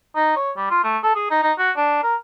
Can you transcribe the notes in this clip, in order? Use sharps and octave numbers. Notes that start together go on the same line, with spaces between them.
D#4
C#5
G3
F4
A3
A4
G#4
D#4
D#4
F#4
D4
A#4